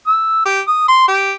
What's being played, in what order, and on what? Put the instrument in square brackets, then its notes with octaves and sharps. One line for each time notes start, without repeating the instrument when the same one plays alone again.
[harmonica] E6
G4
D#6
C6
G4